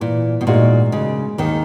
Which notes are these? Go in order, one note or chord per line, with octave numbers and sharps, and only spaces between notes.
A#2 E3
B2
A#2 G#3 D#4 F#4
C#3 G#3
D#2 D#3 D#4 G#4